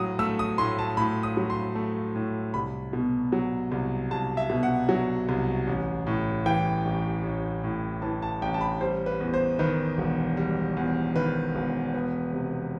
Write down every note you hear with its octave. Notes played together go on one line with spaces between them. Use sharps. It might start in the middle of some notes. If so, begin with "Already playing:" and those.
Already playing: A2 F#3 D#6
A3 E6
D#6
A2 C6
A5
A2 B5
D#6
F#3
C6
A3
A2
C2 B5
B2
F#3
C2
C2 A5
E5
B2
F#5
F#3
C2
A1
A2
E3 G5
A1
A1
A2
E3 A5
A5
A1 G5
A5
B5
G3 C5
B4
E2
C5
D#3 B4
E1
G3
E2
D#3 B4
E1
B3
C3